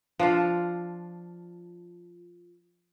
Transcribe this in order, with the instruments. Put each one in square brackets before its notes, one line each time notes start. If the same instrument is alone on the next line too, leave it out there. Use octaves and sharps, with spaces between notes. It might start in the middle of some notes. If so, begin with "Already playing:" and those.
[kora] F3 D4 F4